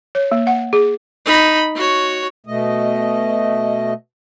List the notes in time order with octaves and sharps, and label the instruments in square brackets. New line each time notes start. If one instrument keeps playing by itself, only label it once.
[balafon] C#5
A#3
F#5
G#4
[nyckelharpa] D#4 B5
F#4 C#5
[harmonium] B2 A3 D#5